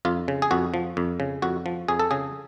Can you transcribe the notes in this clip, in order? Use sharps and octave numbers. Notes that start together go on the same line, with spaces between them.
F2 F4
C#3
G#4
F2 F#4
F3
F2
C#3
F2 F#4
F3
F2 G#4
A4
C#3 G#4